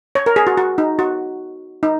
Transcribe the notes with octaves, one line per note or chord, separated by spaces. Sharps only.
C#5
A#4
G#4
F#4
F#4
D#4
F#4
D#4